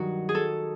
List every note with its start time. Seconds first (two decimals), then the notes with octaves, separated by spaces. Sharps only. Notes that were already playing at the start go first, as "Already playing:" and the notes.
Already playing: G2 D#3 F#3 D#4 F#4
0.29 G#4
0.35 A4